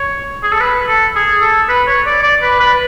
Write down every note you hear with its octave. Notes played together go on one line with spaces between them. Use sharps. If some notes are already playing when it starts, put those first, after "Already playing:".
Already playing: C#5
G#4
A4
B4
A4
G#4
A4
B4
C#5
D5
D5
B4
B4